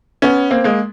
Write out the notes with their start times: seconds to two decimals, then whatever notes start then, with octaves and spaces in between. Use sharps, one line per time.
0.22 B3 C#4
0.51 A#3 C4
0.64 G#3 A#3